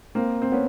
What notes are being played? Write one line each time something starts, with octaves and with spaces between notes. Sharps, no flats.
A#3 C4
C4
B3 C#4